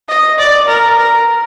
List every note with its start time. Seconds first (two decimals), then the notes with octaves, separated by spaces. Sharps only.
0.09 D#5
0.38 D5
0.68 A#4
0.98 A#4